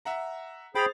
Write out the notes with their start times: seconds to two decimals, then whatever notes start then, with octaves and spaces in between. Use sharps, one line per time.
0.05 E5 F#5 A#5
0.75 G#4 C5 G5 B5 A6 F7